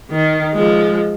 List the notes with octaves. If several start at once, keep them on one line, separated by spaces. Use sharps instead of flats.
D#3
F3 G#3